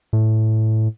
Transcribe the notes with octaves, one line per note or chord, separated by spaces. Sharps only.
A2